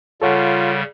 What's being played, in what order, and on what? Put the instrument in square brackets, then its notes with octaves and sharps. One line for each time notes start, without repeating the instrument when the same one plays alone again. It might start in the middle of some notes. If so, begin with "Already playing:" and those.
[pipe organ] C#3 G3 [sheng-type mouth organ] F4 [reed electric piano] A4 C#5 F#5